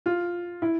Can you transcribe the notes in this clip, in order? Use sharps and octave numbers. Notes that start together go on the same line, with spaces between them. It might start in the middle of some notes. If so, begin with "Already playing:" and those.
F4
E4